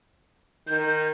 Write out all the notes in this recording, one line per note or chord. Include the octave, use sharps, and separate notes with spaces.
D#3 G6